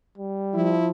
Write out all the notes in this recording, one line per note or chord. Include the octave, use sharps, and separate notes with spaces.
G3
F3 E4